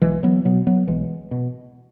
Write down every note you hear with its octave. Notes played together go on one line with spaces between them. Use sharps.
B1 E3 G#3
F#3 B3
B2 F#3 B3
F#3 B3
B1 E3 G#3
B2